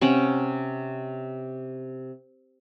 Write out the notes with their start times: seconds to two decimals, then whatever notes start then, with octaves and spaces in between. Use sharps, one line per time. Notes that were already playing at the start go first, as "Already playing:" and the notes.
0.01 C3 C#4 F#5 G5